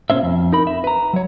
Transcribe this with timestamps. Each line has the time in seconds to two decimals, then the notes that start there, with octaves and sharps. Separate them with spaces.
0.10 B2 F#3 C#4 C5 E5
0.23 F2
0.53 D#4 A#4 B5
0.67 E5
0.84 B4 A#5
1.13 F#3 C#5